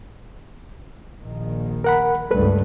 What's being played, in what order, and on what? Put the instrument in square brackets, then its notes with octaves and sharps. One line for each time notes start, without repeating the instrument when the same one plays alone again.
[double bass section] A#1 D#3
[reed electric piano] A#4 F#5 B5
[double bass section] C#2 G2 A3 [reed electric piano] A4 B4